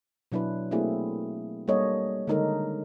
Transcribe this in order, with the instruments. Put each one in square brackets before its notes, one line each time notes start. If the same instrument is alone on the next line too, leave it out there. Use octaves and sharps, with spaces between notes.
[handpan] B2 F#3 D4 E4 B4
A3 A#3 C4 E4 F#4 G#4
G3 A#3 D4 A4 C#5 D#5
D3 D#3 G#3 D#4 A4 A#4